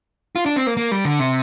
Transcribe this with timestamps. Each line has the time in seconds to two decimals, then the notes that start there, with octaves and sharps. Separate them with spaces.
0.36 F4
0.46 D4
0.56 C4
0.67 A#3
0.77 A#3
0.92 G3
1.05 D3
1.19 C3